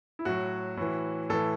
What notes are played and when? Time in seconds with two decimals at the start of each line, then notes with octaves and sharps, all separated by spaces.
0.19 E4
0.25 A2 F#3 F#4
0.77 A2 E3
1.30 A2 E3 A4